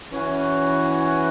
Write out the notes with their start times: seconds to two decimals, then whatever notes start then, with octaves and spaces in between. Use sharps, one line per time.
0.11 E3 C#4 F#4